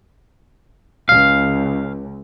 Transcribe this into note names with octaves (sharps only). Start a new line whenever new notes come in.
C#2 F5